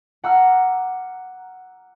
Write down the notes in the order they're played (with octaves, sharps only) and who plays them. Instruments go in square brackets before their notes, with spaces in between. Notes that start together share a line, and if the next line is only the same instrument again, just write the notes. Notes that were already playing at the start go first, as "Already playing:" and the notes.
[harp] F#5 A#5 D6 E6 F6